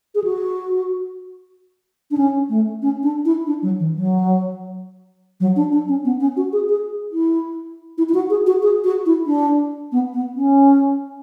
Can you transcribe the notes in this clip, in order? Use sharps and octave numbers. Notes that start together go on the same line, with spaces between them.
G#4
F#4
D4
C#4
A3
C#4
D4
E4
D4
F#3
E3
F#3
F#3
D4
D4
C#4
B3
C#4
F#4
G#4
G#4
E4
E4
E4
F#4
G#4
F#4
G#4
F#4
E4
D4
B3
B3
C#4